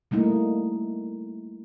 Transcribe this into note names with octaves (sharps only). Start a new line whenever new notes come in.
G3 A3 A#3 D#4 E4